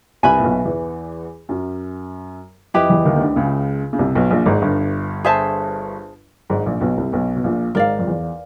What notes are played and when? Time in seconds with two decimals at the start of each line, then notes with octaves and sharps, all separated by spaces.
0.23 C2 C3 B4 E5 G#5 B5
0.38 A#2
0.44 B1 B2
0.65 E2 E3
1.49 F#2 F#3
2.74 F2 F3 E4 G4 B4 D#5
2.90 E2 E3
3.05 D#2 D#3
3.16 D#3
3.20 D2 D3
3.36 C#2 C#3
3.93 C#3
3.99 C2 C3
4.15 B1 B2
4.31 A#1 A#2
4.46 G#1 G#2
4.61 G1 G2
5.24 G#4 C5 E5 A5
6.50 G#1 G#2
6.65 A#1 A#2
6.81 B1 B2
6.98 C2 C3
7.12 B1 B2
7.36 B2
7.44 A#1 A#2
7.75 G#1 G#2 A#4 D5 F5
7.99 F2
8.07 E2